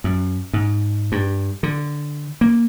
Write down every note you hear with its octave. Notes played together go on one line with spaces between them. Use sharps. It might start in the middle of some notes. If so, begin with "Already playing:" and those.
F#2
G#2
G2
D3
A#3